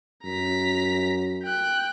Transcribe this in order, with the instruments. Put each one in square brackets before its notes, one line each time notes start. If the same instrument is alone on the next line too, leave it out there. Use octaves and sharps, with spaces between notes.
[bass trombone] F#2 [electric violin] A#5 B6
[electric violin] G5 F#6